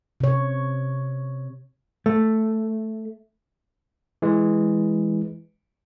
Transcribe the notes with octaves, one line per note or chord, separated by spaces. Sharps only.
C3 C#5
A3
E3 G#3